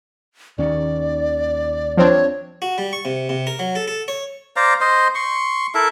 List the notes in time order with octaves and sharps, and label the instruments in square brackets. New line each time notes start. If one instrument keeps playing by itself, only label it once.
[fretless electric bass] D#2 D#3 C#4 [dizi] D5
[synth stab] F3 C4 D4 [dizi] C#5
[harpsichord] F#4
G3
C#6
C3
C3
A#4
F#3
A4
A4
C#5
[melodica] C5 D5 F5 A#5
C5 D#5 C6
C6 C#6
E4 A4 A#4 E5